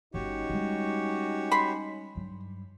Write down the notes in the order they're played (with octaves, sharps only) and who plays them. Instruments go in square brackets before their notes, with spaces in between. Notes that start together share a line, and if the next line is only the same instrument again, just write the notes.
[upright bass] G1 [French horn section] C#4 D#4 [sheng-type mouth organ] F#4 G4 C#5
[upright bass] G3 G#3
[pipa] B5 C6
[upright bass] G2 F#3